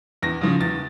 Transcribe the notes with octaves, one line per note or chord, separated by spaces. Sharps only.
E2 A#6
C#3 F3
E2 A6